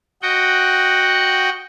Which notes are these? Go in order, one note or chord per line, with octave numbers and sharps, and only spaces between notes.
F#4 D#5 F#5 G5